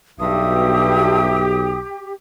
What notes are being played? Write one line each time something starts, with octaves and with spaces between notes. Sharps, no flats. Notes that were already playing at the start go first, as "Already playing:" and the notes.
B1 G2 B2 G4 E5 D#6